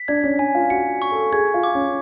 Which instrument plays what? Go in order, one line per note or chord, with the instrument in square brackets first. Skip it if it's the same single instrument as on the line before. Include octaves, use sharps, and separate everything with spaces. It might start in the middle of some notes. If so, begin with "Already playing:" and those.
Already playing: [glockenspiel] B6
[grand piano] D4 [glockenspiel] G#6
[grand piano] C#4
[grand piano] D4 [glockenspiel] G#5
[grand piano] F4
[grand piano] F#4 [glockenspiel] C#7
[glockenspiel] C#6
[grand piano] A4
[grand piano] G#4 [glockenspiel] G#6
[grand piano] F4
[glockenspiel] D6
[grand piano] C#4